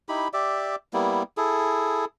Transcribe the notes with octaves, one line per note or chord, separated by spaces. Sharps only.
D#4 E4 G4 B5
G4 D5 E5
G3 A#3 B3 E4
E4 G#4 A4